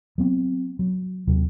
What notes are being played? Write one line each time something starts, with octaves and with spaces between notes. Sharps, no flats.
F#3 B3 C4
F#3
D#2 C3 F#3